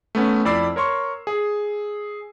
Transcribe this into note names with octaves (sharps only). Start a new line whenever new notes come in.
A3 B3 C#4
F2 E4 D5 B5 E6 C7
A#4 C#5 C6 C#6
G#4